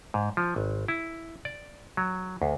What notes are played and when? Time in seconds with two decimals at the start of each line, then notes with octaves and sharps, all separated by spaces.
0.14 G#2
0.37 F3
0.56 G#1
0.88 E4
1.45 D5
1.97 F#3
2.42 D2